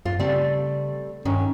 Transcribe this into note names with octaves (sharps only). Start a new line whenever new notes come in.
F#2 F4
C#3 G3 A3 C4
G2 D#3 C#4